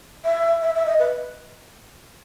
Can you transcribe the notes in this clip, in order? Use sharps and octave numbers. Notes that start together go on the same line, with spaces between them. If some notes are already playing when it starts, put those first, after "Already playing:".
E5
E5
E5
D#5
B4